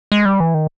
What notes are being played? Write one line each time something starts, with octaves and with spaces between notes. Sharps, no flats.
G#3
G3
E3
D#3